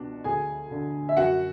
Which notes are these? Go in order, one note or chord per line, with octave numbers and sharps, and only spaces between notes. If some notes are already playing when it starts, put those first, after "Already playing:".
Already playing: C#2 B2 D4 F#4
D2 G#4 G#5
D3
E5
F#2 F#4 F#5